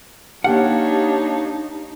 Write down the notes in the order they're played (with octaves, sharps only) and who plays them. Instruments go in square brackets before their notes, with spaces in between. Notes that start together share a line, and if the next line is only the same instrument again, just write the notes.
[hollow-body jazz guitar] A#3 F#5 [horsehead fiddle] D4 C#5 [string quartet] D#4 [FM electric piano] G4 F5